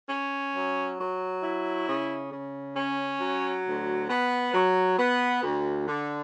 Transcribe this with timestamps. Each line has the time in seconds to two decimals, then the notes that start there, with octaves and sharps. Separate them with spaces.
0.09 C#4
0.54 F#3
0.99 F#3
1.42 E4
1.87 C#3
2.32 C#3
2.76 C#4
3.21 F#3
3.65 D2
4.09 B3
4.53 F#3
4.99 B3
5.43 D2
5.87 D3